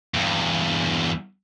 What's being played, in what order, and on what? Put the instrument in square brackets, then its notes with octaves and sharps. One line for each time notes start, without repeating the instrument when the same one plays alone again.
[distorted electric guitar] E2 G2